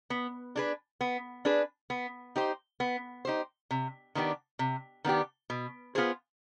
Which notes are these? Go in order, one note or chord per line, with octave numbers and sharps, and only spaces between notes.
B3
D4 G#4 B4
B3
D4 G#4 B4
B3
D#4 G4 C5
B3
D#4 G4 C5
C3
D#3 B3 D4 G4
C3
D#3 B3 D4 G4
B2
B3 F4 G#4 C5